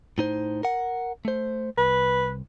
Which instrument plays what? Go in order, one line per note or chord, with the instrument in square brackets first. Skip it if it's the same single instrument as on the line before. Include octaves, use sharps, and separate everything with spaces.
[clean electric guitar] A2 D#4 C5
A#4 F#5
A3 C5
[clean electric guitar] C2 [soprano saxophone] B4